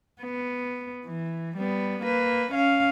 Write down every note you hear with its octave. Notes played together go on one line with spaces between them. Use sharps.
B3
E3
G3 B3
A#3 B4
C#4 F5